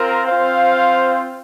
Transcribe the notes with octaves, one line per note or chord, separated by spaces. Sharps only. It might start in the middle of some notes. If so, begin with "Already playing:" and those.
Already playing: C4 F4 A#4
C4 F4 C5 F5